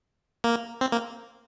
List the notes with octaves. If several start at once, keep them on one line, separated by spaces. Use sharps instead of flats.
A#3
C4
A#3